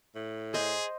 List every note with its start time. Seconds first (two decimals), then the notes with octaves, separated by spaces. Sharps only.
0.15 A2
0.54 G#4 C5 D#5